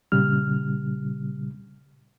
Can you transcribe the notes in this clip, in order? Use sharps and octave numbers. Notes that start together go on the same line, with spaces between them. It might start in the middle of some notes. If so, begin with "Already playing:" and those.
A#2 C#3 G3 F6